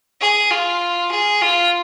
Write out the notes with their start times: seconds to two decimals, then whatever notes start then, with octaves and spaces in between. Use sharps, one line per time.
0.21 G#4
0.51 F4
1.11 G#4
1.41 F4